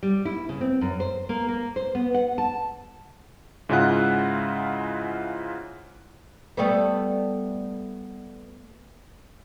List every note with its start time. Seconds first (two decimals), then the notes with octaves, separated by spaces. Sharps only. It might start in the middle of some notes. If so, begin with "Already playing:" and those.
0.03 G3
0.25 E4
0.49 C#3
0.61 C4
0.81 F#2
1.00 C5
1.29 A#3
1.49 A#3
1.76 C5
1.95 B3
2.14 F#5
2.38 A5
3.69 G#2 C#3 E4 F4 F#5 F#6
6.57 G3 A3 B3